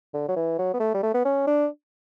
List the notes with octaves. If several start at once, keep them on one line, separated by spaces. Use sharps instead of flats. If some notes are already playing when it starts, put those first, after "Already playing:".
D3
F#3
E3
F#3
B3
A3
G3
A3
B3
C#4
D4